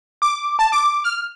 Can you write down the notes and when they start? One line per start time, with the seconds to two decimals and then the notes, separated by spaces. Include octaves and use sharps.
0.22 D6
0.59 A5
0.72 D6
1.04 F6